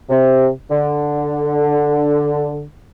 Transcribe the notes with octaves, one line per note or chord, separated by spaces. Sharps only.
C3
D3